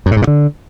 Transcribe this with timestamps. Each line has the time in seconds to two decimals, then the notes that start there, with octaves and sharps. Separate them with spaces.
0.06 F#2
0.11 A2
0.17 G#2
0.22 A#2
0.27 D3